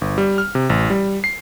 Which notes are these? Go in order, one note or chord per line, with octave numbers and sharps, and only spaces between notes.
G1
G3
F6
C3
A1
G3
C7